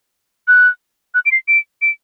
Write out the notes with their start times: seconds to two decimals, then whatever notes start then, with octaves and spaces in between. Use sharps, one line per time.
0.48 F#6
1.14 F#6
1.26 D7
1.32 C7
1.48 D7
1.82 D7